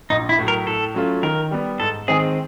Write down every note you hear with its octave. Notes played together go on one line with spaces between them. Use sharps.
A#1 D#4
E4
A2 F#3
A#4
A2 A4
F#3 A3 C#4 F4
D#3 A#4
G3 B3
G#2 A4
D#3 G#3 C4 G#4